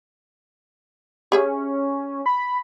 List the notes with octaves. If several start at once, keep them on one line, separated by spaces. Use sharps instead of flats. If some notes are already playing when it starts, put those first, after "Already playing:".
C#4 G4 G#4 E5
B5